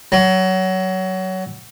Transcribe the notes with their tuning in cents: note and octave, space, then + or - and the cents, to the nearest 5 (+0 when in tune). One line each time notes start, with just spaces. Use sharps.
F#3 +20